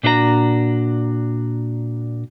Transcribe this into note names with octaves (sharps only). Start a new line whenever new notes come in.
A#2 D4 F#4 C5 A#5